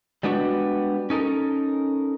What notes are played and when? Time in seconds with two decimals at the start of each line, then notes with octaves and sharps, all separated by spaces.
0.23 G3 G#3 B3 D4 F4 F#4
1.10 C#4 D#4 A4 A#4